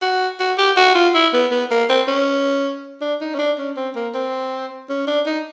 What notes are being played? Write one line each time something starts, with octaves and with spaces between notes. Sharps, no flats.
F#4
F#4
G4
F#4
F4
E4
B3
B3
A#3
C4
C#4
D4
D#4
C#4
D4
C#4
C4
A#3
C4
C#4
D4
D#4